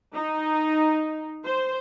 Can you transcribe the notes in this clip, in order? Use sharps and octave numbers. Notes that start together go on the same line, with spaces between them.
D#4
C5